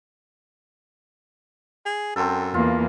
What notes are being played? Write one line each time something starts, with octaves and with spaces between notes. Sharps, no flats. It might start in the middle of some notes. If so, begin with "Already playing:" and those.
G#4
F#2 C4 A4
E2 A#3 F4